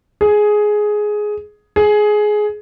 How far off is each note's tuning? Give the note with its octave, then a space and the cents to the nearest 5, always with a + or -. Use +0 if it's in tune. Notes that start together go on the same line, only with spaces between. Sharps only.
G#4 +10
G#4 +15